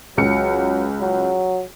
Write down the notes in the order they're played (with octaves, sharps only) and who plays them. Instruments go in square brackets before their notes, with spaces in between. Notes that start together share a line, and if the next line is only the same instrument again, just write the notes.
[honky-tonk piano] C#2 C#7 [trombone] F#3
[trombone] F#3